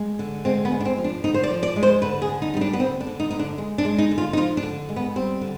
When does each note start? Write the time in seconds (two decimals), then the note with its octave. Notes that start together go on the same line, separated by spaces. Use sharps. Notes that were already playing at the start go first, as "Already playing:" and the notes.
Already playing: G#3
0.19 D3
0.45 G#3 C4
0.65 B3
0.72 G#3
0.80 D4
0.85 C4
0.98 F3
1.04 D4
1.24 D3 D#4
1.34 C5
1.43 D5
1.50 F3
1.63 D5
1.76 G#3
1.83 C5
2.02 D3 B4
2.22 G#4
2.29 D3
2.42 D#4
2.54 G3 D#4
2.61 D4
2.73 B3
2.80 D3 C4
3.01 D4
3.07 D3
3.20 D#4
3.30 D3 D#4
3.39 D4
3.58 G#3
3.78 D4
3.85 G#3
3.98 D#4
4.11 D3
4.18 F4
4.33 D#4
4.37 F3 F4
4.57 D4
4.63 D3
4.89 G#3
4.96 B3
5.16 G3 C4
5.41 D3